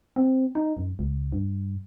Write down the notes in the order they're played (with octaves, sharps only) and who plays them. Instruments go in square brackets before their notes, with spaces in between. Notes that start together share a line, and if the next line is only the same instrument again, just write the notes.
[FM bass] C4
D#4
F#2
C#2
G2